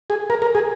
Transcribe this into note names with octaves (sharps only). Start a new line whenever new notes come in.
G#4
A#4
A#4
G#4